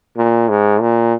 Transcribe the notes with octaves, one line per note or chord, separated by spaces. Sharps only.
A#2
G#2
A#2